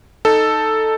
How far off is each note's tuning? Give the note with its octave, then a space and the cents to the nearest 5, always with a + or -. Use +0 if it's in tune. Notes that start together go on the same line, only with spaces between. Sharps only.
D#4 +0 A4 +0